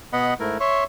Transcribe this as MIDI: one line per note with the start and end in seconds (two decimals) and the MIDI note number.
0.13 0.34 47
0.13 0.34 59
0.13 0.34 75
0.13 0.34 78
0.13 0.34 83
0.40 0.58 44
0.40 0.58 57
0.40 0.58 64
0.40 0.58 70
0.60 0.84 73
0.60 0.84 76
0.60 0.84 84
0.60 0.84 85